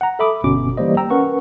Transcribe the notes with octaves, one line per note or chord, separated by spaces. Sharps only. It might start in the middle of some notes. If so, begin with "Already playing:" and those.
F#5 A#5
A4 E5 B5 D6 D#6
G1 B2 C#4 D6
E3 G3 A#3 C5 D#5
G5 A#5 E6
C#4 A#4 B4 F#5 C#6